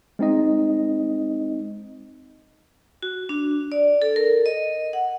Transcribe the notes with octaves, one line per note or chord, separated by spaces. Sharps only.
G#3 C4 D#4 D#5
F#4
D4
D5
A4
A#4
D#5
F#5